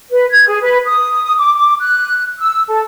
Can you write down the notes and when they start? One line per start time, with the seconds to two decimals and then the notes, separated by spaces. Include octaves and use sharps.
0.10 B4
0.30 G#6
0.47 G#4
0.62 B4
0.85 D#6
1.23 D#6
1.36 D6
1.55 D6
1.80 F#6
2.39 E6
2.69 A4